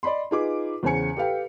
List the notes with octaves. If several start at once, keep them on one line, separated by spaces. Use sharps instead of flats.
D5 D#5 B5 C6
D#4 F4 G#4 B4 D6
E2 C#3 C5 G#5 C#7
G4 A4 B4 F5 G5